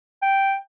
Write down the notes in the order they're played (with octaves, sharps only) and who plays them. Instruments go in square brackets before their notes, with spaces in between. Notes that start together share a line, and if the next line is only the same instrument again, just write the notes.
[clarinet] G5